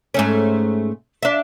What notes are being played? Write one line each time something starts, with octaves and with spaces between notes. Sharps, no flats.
G#2 A3 C#4
D4 E5